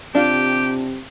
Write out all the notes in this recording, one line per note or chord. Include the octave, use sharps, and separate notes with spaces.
C3 D4 F4 G4